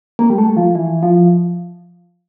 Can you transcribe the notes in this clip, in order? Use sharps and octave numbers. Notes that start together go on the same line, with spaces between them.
A#3
G3
A3
F3
E3
F3